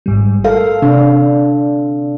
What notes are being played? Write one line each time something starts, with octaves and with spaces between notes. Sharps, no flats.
G#1 G#2 G3
A4 A#4 F5
C3 D4